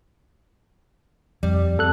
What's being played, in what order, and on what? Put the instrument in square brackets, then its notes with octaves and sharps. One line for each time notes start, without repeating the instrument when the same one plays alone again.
[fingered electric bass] F2 [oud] G3
[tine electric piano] F2 A4 F#6